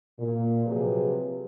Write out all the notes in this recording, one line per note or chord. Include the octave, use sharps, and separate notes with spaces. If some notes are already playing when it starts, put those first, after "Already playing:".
A#2
C3 F3 F#3 G#4 B4